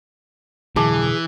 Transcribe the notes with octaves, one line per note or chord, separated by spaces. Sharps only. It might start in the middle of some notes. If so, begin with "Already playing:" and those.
B2 D3 E3 F#3 G#4 A5 D6